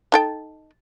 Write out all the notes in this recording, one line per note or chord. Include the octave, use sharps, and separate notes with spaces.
D#4 A4 G5